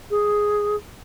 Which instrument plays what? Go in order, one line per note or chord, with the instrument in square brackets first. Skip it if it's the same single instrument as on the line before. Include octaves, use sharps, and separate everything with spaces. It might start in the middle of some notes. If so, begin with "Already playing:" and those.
[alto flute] G#4